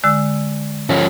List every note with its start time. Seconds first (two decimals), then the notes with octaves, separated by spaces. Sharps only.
0.04 D3 G#3 E6
0.90 F3 C#4